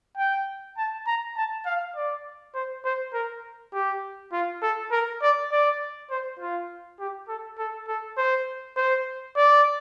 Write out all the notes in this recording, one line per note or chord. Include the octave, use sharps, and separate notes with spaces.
G5
A5
A#5
A5
F5
D5
C5
C5
A#4
G4
F4
A4
A#4
D5
D5
C5
F4
G4
A4
A4
A4
C5
C5
D5